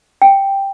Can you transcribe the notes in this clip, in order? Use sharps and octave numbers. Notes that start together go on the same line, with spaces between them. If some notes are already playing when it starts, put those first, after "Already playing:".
G5